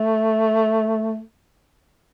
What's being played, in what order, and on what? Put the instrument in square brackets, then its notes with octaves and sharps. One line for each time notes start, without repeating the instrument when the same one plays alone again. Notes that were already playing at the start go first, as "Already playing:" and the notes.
Already playing: [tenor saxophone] A3